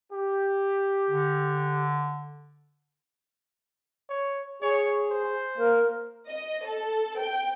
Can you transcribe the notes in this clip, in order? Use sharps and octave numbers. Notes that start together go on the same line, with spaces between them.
G4
D3
C#5
G#4 C#5
C5
A#3 A#4
D#5
A4
G5